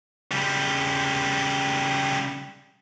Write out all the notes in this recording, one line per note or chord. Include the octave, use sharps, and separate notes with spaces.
C#3 G3